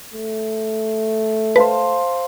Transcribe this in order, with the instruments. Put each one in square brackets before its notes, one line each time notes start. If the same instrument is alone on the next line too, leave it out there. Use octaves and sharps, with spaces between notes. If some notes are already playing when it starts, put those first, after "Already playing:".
[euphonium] A3
[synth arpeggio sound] B4 [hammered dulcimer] C5 F5 A5